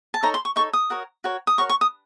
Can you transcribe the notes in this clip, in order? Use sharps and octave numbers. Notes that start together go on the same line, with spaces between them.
A5
D#4 A4 C#5 A#5
C6
C#6
D#4 A4 C#5 C#6
D#6
F#4 A#4 C#5
F#4 A#4 C#5
D#6
F#4 A#4 C#5 C#6
C#6
D#6